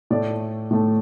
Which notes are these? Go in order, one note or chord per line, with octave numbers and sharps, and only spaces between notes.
A2 A3 D5
A2 A3